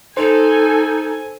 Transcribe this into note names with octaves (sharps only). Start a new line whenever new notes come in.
D#4 A4 C5 G#5